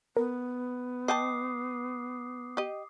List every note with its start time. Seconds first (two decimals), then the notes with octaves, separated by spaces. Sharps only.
0.17 B3 A#4
1.08 D#5 G5 A5 D6 D#6 C7
2.57 G4 D#5